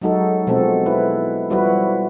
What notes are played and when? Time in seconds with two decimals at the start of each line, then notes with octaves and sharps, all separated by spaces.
0.02 F#3 G#3 D#4 F#4 A4
0.47 B2 F3 G#3 C4 F#4 A4
0.86 E4 B4
1.50 F3 G3 E4 F#4 B4